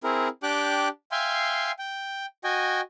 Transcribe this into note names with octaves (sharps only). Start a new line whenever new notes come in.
C4 E4 G#4 A#4
D4 G4 G5 D6 F#6
E5 F5 G5 G#5 C6
G5
F#4 D#5 G5 G#5